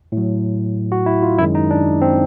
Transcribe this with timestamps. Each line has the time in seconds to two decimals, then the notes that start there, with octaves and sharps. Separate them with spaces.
0.12 A2
0.17 F#3
0.92 F#4
1.06 E4
1.22 F4
1.38 F#2 D#3 G#3 E4
1.55 D#4
1.71 D4
2.01 C4